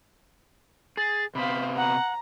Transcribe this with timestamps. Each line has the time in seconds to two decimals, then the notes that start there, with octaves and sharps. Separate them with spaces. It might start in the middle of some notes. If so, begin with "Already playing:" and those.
0.97 G#4 A6
1.35 C3 B3 C5 F5 B5
1.77 F#5 A#5